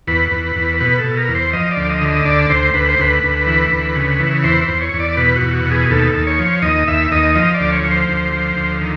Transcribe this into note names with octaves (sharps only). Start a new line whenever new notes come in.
E2 B4
E2
E2
B2 B4
A4
B2
A#4
E2
C5
F3 D#5
D5
D2
D#5
D3
D#5
D2 D5
D2 C5
D2 B4
C5
D2 B4
D2
E3
D2
C#3
E3
E2 C5
C5
E2
C#5
E2
D5
B2 B4
F#4
E2
F#4
B2
G#4
D#2 A4
D#2
C#5
F3
D#2 D#5
D#2 E5
D#2 D#5
F3 D#5
D5
D2
C#5
F3
C5
D2
F3
D2
D#3